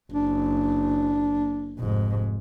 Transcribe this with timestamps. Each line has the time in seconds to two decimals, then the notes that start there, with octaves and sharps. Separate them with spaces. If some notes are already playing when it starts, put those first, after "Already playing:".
0.12 F#1 D4
1.79 F1 G#2